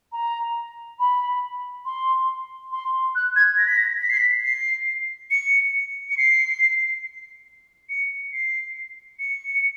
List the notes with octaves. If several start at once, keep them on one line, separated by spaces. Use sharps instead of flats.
A#5
B5
C6
C6
F#6
G#6
A#6
B6
A#6
B6
C7
B6
C7
C#7
C#7
C7
C#7
C7
C#7